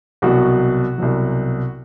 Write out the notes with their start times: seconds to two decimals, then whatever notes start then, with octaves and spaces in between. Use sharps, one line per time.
0.22 C2 B2 F#3 F#4
0.98 C2 B2 F#3